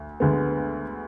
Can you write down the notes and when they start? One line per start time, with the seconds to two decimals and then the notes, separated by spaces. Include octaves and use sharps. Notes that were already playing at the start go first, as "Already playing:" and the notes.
Already playing: D2
0.20 D2 D3 G#3 B3